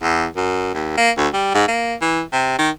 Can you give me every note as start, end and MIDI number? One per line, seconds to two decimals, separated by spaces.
0.02 0.26 40
0.37 0.73 42
0.74 0.93 39
0.97 1.11 58
1.17 1.28 38
1.34 1.51 55
1.55 1.67 44
1.68 1.95 58
2.01 2.21 52
2.33 2.57 48
2.59 2.70 51